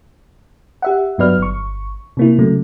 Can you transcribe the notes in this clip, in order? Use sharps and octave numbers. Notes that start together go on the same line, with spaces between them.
G4 E5 F#5
G2 F#3 B3 B4 D5 F6
G1 C#6
C3 A#3 E4
C#3 F#3 A3